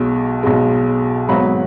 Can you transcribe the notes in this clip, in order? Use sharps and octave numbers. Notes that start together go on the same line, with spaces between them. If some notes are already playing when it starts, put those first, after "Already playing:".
Already playing: B1 B2 G#3
B1 B2 G#3
G#1 G#2 F#3 B3 B5